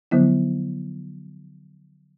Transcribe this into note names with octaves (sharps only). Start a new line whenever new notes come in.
D3 F3 F#3 B3 E4